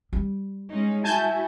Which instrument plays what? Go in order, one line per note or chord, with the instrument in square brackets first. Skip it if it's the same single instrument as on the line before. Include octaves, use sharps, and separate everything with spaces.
[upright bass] G3
[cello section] G#3 C#4 D#4
[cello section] E4 F#4 [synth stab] G#5 A5 G6